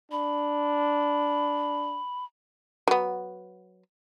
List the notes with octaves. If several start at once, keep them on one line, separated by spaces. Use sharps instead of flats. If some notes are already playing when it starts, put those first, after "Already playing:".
D4 B5
F#3 B3